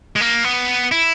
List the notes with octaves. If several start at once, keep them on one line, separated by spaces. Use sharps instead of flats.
G#3
A#3
B3
E4